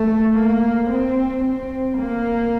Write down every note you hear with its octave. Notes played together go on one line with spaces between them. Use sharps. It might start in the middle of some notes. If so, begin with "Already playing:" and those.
Already playing: A3
A#3
C4
C4
A#3